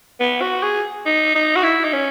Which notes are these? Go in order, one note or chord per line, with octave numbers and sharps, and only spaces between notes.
B3
F#4
G#4
D#4
D#4
F#4
E4
D#4
C#4